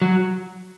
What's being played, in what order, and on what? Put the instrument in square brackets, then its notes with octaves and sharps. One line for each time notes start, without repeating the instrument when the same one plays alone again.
[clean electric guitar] F#3